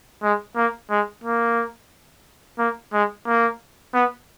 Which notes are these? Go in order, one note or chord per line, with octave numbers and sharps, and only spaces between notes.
G#3
A#3
G#3
A#3
A#3
G#3
A#3
B3